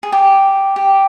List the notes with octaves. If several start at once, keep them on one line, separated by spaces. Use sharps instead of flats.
G#4
G4
G4